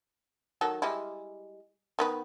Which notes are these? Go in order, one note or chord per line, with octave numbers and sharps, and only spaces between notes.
D#3 F#3 A4
G3 G#3 E4
D#3 B3 B4